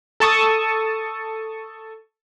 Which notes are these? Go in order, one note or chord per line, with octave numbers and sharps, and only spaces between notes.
A4 A5 C#6 D#6